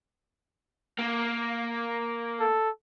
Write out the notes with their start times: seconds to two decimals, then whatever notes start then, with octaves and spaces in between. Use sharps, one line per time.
0.99 A#3
2.40 A4